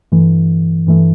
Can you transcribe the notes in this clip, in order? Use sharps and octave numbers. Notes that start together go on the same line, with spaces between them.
G2 E3 A3
G2 E3 A3